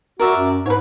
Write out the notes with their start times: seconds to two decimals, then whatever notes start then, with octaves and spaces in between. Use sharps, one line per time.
0.19 F#4 A#4 D5 E5
0.37 F#2
0.66 G#2 B4 C#5